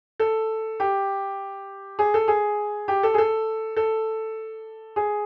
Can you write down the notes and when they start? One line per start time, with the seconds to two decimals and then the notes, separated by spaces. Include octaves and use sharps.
0.20 A4
0.80 G4
1.99 G#4
2.14 A4
2.28 G#4
2.88 G4
3.03 A4
3.14 G#4
3.18 A4
3.77 A4
4.96 G#4